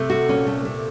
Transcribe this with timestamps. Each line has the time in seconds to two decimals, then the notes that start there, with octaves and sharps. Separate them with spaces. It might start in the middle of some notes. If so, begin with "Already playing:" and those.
Already playing: C3 A3
0.10 F#4
0.28 A#2 C#4
0.47 A3
0.65 A3